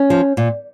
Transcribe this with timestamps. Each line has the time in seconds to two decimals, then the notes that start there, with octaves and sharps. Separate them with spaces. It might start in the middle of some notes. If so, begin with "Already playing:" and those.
Already playing: C#4
0.10 F3
0.37 A#2